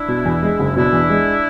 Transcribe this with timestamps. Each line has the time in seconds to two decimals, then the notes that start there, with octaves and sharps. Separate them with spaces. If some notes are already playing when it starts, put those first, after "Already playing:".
Already playing: D4 E4
0.08 B2
0.25 E2
0.43 G#3
0.59 F#1
0.75 B2 D4 E4
0.93 E2
1.10 G#3